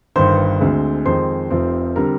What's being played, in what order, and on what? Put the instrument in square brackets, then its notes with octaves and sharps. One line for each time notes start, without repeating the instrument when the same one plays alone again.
[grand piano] G1 G2 D#3 C5 C6
D2 D3 G#3 C4
F2 D#3 G#3 C5 C6
F1 F2 C3 F3 C4
D3 G3 C4 A#4 A#5